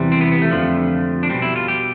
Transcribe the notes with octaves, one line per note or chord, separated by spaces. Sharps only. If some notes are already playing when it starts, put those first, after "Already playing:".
Already playing: E2 C3 E3 G3
C4
B3
B3
A3
F2 D3 F3
D4
B2 G3 C4
E4
F4
G4